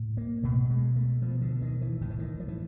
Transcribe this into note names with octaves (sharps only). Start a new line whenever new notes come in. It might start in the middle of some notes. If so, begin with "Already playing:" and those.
Already playing: A2
A#3
B2 A3
G#3
A3
B2 F3
D3
D#3
E3
A2 D#3
E3
D#3
F3
E3